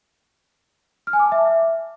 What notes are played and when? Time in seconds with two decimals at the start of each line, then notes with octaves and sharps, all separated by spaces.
1.07 F6
1.13 G#5
1.19 D6
1.26 A5
1.32 E5